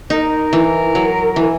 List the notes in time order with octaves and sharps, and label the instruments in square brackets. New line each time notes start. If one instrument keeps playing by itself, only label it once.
[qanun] D#4 [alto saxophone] A#4
[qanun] E3
F#3
E3